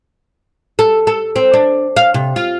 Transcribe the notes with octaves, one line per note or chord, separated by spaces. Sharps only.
A4
A4
C4
D4
F5
C3
F4